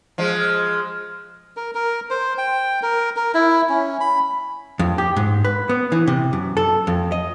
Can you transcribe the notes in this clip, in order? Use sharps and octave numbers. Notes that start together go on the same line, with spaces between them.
F3 G#3
A#4
A#4
C5
G5
A#4
A#4
E4
C#4
B5
F2
G4
G#2
B4
B3
E3
C3
F#2
A4
F2
D#5